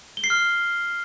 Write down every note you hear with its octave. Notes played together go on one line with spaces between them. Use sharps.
G7
C7
F6